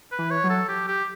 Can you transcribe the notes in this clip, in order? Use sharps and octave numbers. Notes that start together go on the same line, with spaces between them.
B4
E3
C#5
F#3
A4
G4
G4